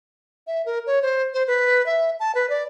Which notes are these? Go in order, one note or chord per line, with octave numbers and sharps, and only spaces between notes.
E5
A#4
C#5
C5
C5
B4
E5
A5
B4
D5